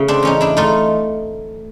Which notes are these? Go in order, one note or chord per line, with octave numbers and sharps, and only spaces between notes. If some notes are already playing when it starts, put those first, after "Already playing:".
Already playing: C#3 A3
C4 D4
E2 C#4 D#4
D4 E4
A3 D#4 F4